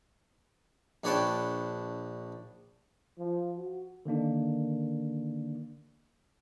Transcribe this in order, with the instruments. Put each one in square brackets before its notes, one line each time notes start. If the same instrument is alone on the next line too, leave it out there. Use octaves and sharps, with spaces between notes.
[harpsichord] A#1 D4 B4 C#5 G5 A5
[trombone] F3
F#4
[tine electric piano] D3 D#3 A#3 D4